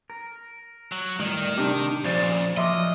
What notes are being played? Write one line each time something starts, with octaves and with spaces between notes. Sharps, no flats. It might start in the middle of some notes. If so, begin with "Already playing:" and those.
A#4
F#3
A2 D#3 G3
C3 D4 G4
A#2 C#3 F3 C5 D5
F3 F#3 A#4 D#5 E5 C6 D6